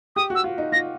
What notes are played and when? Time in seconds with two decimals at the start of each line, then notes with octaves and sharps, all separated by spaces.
0.16 G4 D#6
0.30 F#4
0.35 E6
0.44 F4
0.58 D#4
0.72 F4 A#6